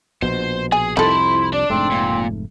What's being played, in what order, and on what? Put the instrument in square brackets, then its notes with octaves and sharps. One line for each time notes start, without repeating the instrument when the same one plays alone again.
[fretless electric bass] A#1 B2 [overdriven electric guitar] C5
[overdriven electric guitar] G#4 [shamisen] G#5
[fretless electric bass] C2 F2 C3 [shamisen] D#3 A4 [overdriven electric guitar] E4 B5 [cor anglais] C5
[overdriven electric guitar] D4 [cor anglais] D5
[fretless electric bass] F1 G#2 A3 [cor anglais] C4
[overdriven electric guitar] A#2